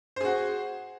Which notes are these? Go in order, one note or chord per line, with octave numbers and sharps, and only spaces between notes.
F#4 G#4 C5